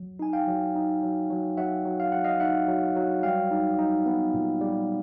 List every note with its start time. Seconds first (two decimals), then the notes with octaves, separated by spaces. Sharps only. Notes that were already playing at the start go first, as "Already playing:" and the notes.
Already playing: F#3
0.19 D#4 G#5
0.33 F5 G5
0.47 F#3
0.75 D#4
1.02 F#3
1.30 F#3
1.57 F#3 E5 F#5
1.85 F#3
2.00 F5
2.12 F#3 F#5
2.24 D#5 F5
2.40 D#4 E5 F#5
2.68 F#3
2.96 F#3
3.23 G3 F5 G5
3.51 D#4
3.78 D#4
4.06 B3
4.34 A#2
4.61 G3